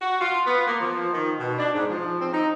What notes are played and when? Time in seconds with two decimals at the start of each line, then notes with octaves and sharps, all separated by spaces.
0.02 F#4
0.20 F4
0.45 B3
0.67 A#3
0.80 F3
1.12 D#3
1.39 B2
1.58 D4
1.74 G#2
1.89 F3
2.19 C4
2.32 D#4